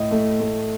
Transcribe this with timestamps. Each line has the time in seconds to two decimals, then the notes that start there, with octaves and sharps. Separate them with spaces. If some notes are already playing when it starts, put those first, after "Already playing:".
Already playing: A2 D#5
0.11 A3
0.40 A3